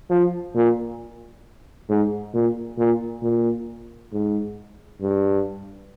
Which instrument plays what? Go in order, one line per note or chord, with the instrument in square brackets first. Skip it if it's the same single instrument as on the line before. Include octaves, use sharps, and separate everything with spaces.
[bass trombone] F3
A#2
G#2
A#2
A#2
A#2
G#2
G2